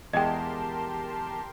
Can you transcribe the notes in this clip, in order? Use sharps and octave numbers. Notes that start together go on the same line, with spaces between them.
E2 G#3 G4 A#4 D#5 G5 A5 C6